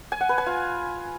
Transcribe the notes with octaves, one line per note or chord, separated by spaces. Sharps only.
G#5
F#5
B4
G#5
F4